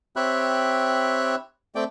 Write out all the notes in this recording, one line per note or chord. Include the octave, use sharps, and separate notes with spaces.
C4 G4 C#5 E5 B5 F#6
A3 C4 D5 G5